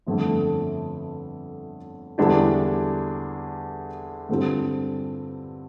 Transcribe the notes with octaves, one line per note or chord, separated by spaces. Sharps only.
G1 F2 D3 A3
E2 D3 G3 D4 G4
G2 D3 G3 C4 F4